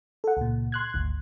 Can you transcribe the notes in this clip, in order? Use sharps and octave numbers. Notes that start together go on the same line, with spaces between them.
A4 F#5
C#2 A#2
C6 F#6 G#6
G#1 D2